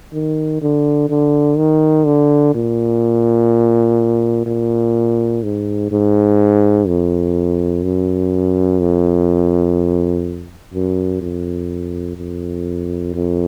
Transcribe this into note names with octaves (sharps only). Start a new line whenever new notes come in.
D#3
D3
D3
D#3
D3
A#2
A#2
G#2
G#2
F2
F#2
F2
F#2
F2
F2
F2